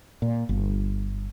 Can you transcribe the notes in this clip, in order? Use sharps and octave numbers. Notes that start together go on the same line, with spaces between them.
A#2
G1